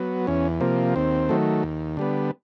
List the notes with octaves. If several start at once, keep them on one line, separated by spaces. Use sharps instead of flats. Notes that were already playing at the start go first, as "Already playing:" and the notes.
Already playing: F#3 B3
E2 C#4
C3 F3 A#3
D#2 C4
D#3 F#3 A3
D#2
D3 G3 B3